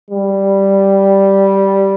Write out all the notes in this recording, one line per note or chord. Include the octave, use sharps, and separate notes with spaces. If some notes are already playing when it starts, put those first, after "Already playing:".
G3